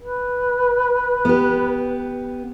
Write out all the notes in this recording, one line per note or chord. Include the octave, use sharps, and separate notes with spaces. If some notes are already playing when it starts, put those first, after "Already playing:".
B4
B3 G4